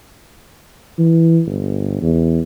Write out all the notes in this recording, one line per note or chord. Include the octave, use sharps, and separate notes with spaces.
E3
G1
E2